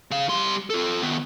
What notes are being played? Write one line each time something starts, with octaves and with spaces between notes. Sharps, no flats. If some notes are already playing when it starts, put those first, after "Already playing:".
C#3 F5
G3 C6
F4 A4
D#3 B3